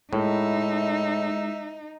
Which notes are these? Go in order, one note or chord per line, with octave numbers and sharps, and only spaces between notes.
A2 G#3 D#4 E4 A#4 E5